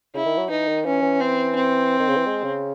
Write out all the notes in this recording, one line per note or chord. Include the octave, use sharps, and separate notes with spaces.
C#3 E4
D#3
F#3
E3 D#4
D#3
E3 C#4
E3
C4
C4
D#3
C#3
E3
G#3
C#3